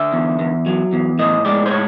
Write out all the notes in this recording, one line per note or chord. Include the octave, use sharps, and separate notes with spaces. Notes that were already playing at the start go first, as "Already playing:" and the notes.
Already playing: D3 E5
E2
E2
F#3
E2
A2 D#5
G#3 D5
C5
A2 C#5